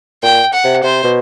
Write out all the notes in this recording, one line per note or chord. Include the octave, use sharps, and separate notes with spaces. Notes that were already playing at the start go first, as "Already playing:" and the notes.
A#2 G5
F#5
C3
C3 C5
B2